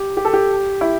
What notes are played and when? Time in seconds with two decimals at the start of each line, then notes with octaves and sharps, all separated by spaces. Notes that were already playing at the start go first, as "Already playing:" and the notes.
Already playing: G4
0.17 G4
0.25 A4
0.33 G4
0.81 E4